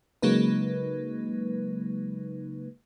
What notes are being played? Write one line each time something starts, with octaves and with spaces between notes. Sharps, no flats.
C#3 F#3 G#3 A#3 D#4 B4